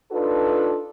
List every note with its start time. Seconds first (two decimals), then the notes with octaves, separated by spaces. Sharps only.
0.12 D4 D#4 F4 A4 B4